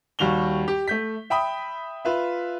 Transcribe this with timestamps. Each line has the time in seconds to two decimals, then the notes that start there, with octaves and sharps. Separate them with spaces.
0.19 D#2 G3 F#4 F7 G7
0.68 G4
0.88 A3 G6 B6
1.30 E5 G5 B5 D#6
2.05 F4 B4 E5